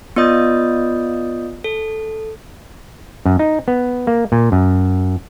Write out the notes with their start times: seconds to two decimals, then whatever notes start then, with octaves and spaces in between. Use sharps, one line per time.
0.16 B3 F4 D5 D#5 D#6 G6
1.64 A4
3.26 F#2
3.39 D#4
3.68 B3
4.07 A#3
4.32 A#2
4.52 F#2